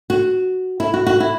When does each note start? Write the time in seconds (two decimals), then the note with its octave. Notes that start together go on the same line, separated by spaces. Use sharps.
0.10 F#4
0.80 E4
0.94 F#4
1.07 F#4
1.20 E4